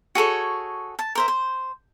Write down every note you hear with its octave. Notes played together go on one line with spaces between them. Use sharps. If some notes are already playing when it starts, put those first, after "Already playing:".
F#4 G#4 A4 C#5
A5
A#4 C5 E5
C5